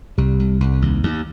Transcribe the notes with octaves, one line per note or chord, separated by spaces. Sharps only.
C2 G3
C2
C2
D#2
D#2